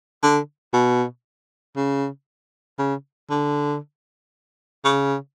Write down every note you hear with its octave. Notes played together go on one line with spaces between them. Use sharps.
D3
B2
C#3
C#3
D3
C#3